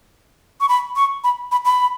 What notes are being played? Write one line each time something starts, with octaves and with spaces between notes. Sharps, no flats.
C#6
B5
C#6
B5
B5
B5